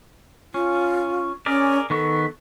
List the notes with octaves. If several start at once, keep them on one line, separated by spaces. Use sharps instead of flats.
C#4 F4
C#4 G#4 A#4 D5
D#3 B3 A4 C#6